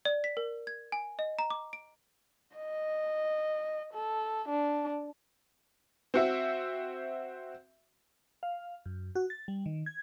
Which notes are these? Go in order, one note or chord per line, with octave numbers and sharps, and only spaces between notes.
D5
B6
A#4
G#6
G#5
D#5
A#5
D6
D7
D#5
A4
D4
C4 F#4 E5
F5
F#2
F#4
A6
G3
D#3
G#6